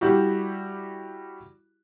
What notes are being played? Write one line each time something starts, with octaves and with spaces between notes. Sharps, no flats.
G3 E4 F#4 G4